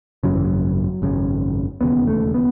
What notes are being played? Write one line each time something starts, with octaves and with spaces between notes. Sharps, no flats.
G#1 F#2 C#3 F#3
E3
F#3
G#1 F#2 C#3
E1 D#2 C#3 B3
A3
B3